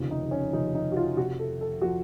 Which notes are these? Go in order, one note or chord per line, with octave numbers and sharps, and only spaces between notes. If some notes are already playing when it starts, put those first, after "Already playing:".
Already playing: F1 D#2 C#3 F3
D#4
C#4
F1 D#2 C#3 F3 D#4
D#4
F#4
F4
F1 F2 C3 F3 F#4
A4
A4
C3 F3 F#4